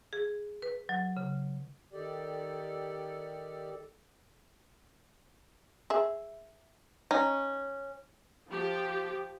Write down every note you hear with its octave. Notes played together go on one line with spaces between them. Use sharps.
G#4
B4
F#3
C#3
D#3 G4 A4 D5
G#4 E5
C#4 D#4
F3 G4